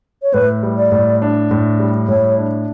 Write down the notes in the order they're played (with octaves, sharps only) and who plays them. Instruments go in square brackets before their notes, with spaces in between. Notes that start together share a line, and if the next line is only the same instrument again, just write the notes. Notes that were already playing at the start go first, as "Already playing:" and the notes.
[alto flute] C#5
[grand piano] A2 [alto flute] B4
[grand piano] G3
[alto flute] D5
[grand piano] A2
D4
A2
G3
[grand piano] A2 [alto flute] C#5
[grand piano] D4